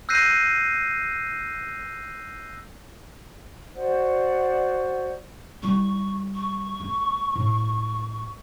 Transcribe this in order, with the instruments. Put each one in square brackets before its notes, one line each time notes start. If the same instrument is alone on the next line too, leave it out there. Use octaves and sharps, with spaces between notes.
[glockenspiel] E6 F#6 G6 A#6 C7 D#7
[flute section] F#4 C5 D5 F#5
[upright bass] G3 E4 [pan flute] C#6
[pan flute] C#6
[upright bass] G#3 A#3
A2